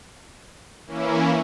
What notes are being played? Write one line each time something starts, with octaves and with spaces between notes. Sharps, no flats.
E3 A#3 C#4 E4